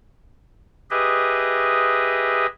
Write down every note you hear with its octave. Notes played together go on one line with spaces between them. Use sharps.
G4 G#4 B4 D#5 E5